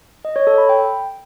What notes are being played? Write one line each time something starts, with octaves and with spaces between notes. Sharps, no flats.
D#5
C#5
A4
B5
G5